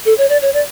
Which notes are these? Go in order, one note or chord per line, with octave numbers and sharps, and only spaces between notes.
A4
C#5
D5
C#5
D5